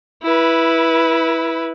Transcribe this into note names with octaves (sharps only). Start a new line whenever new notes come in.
E4 B4